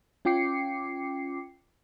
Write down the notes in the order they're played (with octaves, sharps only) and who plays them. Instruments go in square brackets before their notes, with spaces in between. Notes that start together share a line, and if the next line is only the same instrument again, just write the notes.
[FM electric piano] C#4 F4 G5 D6 C7 C#7